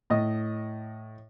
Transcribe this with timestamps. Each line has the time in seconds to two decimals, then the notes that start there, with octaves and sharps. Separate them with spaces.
0.10 A2 D#5